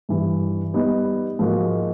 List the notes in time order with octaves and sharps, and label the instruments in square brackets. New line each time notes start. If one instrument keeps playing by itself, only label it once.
[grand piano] G2 E3 G3
G3 B3 D#4 G4 B4
G#2 F3 A#3 D#4 F#4